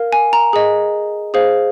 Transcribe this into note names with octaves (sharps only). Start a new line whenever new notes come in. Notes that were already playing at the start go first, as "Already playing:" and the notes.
Already playing: A#4 F5
G#5
A#5
G#4 D#5
G#4 C5 F5